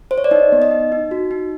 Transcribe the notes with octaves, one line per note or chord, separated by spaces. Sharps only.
C5
C#5
D5
D#4 D#5
B3
D#5
D#4
D#4
F#4
D#4